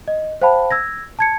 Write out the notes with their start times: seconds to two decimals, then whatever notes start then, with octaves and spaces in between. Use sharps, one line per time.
0.08 D#5
0.42 C5 F5 G5 A5 B5
0.71 E6 G#6 A#6
1.19 A5 G#6 C#7